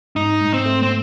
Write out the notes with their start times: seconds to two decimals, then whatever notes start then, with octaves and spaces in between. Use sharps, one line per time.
0.16 G#2 D#4
0.41 G#2
0.54 C4
0.65 A3
0.83 C4